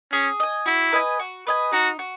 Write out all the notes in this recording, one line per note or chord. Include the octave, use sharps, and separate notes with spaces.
C#4 G#4
D#5 G#5
E4 F#4
B4 D#5 G#5
F#4
B4 D#5 G#5
D#4 F#4
F#4